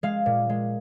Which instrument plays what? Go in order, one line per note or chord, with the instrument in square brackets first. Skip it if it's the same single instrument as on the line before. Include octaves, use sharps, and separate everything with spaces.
[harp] G#3 F5
A#2
G#3